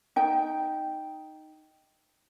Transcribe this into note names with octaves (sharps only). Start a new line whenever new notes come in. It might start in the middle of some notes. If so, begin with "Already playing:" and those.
D#4 G5